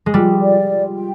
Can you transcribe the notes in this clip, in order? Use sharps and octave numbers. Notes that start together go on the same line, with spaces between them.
G#3
G3 F4
D5
F4
G5